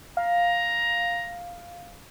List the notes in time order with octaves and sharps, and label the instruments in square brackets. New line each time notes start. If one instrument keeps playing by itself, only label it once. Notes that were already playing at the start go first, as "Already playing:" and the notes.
[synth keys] F5 [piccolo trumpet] A#5